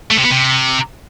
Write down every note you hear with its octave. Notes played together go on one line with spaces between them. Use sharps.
A3
C3
B3
C3